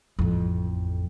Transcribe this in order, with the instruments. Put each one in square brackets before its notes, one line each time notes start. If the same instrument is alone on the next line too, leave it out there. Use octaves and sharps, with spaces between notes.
[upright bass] A1 F2